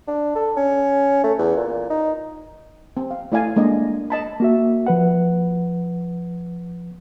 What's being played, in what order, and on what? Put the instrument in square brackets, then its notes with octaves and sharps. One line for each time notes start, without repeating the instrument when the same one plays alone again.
[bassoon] D4
A4
C#4
A3
E2
A#2
D#4
[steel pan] C4
F5
A3 E4 D5 F5 G#5
G#3 A#3 D4 D#5
D#5 A5 B5
[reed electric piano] A#3 F#4 E5
F3 B4 F#5